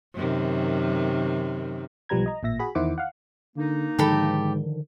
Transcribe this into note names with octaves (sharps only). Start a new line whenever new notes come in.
F#2 C3 D#3
B1 F3 G3 B4 A#5 G#6
D#5 A#5
A1 A#2 E5 A#6
F#4 G#4 B5
E2 D#3 E4 C5 F#5 D6
F5 F#5
D3 A#3 D#4
G#2 D3 D#3 F3 G4 A4 B5